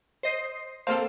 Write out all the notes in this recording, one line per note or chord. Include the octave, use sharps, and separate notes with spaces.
C5 D#5 C7
A#3 C4 A4 C5 F5